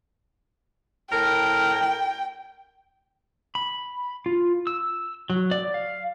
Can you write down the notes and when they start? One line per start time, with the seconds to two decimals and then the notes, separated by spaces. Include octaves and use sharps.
1.12 A2 A#4 G5
3.55 B5
4.26 F4
4.67 E6
5.30 F#3
5.51 D5
5.74 F5